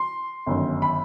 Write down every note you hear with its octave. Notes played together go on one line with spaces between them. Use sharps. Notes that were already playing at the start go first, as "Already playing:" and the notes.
Already playing: C6
G1 F#2 D#3
B5